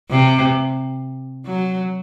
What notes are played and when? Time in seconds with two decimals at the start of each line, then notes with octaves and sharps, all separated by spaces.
0.10 C3
1.46 F#3